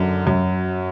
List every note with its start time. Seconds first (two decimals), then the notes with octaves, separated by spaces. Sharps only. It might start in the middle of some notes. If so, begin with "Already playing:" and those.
Already playing: F#2 D3
0.26 F#2 F#3